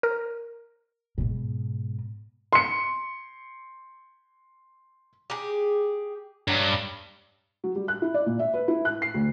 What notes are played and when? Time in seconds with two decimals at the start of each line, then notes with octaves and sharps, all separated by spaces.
0.03 A#4
1.18 G#2 B2
2.53 C6 C#7
5.30 G4 G#4
6.48 G2 F#3
7.64 F#3
7.76 G3
7.88 F#6
8.02 E4
8.14 D5
8.26 A#2
8.39 E5
8.54 B4
8.68 E4
8.85 F#6
9.02 C7
9.14 D2